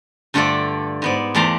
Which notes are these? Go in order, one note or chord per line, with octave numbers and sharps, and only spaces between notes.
G2 D3 A3 F4 A4 D5
G#2 B3 D5
E2 A3 D5 A5 A#5 C6